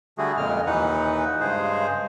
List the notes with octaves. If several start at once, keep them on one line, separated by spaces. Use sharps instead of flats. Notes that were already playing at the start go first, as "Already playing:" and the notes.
D3 G3 A3 F#4 G#4
F2 A#2 C#3 G#3 F6
D#2 A#2 E3 D#4 B4 F#5
G2 C#3 G#3 G#4 C5